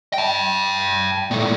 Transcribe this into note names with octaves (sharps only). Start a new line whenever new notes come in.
G5 A5
A#2 A3